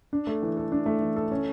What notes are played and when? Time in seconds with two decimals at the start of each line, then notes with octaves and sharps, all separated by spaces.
0.13 D4
0.27 A3
0.43 E3
0.57 A4
0.72 D4
0.86 A3
1.01 E3
1.16 A4
1.31 C#4